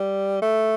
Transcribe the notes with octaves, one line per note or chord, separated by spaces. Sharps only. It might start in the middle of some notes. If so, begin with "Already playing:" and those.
Already playing: G3
A3